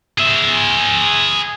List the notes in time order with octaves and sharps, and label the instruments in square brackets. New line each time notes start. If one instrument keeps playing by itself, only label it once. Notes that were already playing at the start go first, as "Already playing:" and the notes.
[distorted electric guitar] G#4 E5